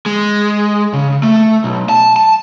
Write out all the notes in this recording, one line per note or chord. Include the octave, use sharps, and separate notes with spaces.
G#3
C#3
A3
B1
A5
A5